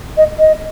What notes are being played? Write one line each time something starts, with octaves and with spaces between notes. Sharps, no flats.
D#5
D#5